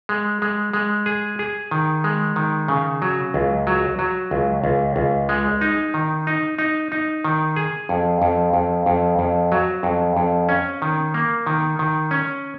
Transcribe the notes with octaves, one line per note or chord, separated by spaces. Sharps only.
G#3
G#3
G#3
G#4
G#4
D#3
G#3
D#3
C#3
F#3
C#2
F#3
F#3
C#2
C#2
C#2
G#3
D#4
D#3
D#4
D#4
D#4
D#3
G#4
F2
F2
F2
F2
F2
F#3
F2
F2
C#4
D#3
A#3
D#3
D#3
C#4